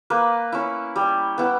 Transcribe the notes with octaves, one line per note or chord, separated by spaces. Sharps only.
A#3 B4
C#4 E4
G3
B3 E4